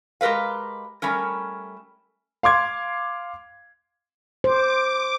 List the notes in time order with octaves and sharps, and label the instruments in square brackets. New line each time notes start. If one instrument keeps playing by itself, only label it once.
[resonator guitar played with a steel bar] G#3 G4 A#4 B4 F5
G3 A3 C#4 A#4
[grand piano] F5 C6 D6 G#6
[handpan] C5 [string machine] D6